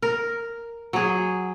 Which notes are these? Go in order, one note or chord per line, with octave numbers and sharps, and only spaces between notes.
A#4
F#3 G#4